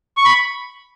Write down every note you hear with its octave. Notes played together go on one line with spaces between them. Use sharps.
C#6
B5